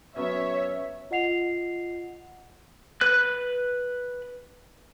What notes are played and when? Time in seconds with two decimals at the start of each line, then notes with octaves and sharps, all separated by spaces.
0.16 F#3 B3 C#4 C#5 E5
1.11 F4 D#5 F#5 C7 F7
3.01 B4 F#6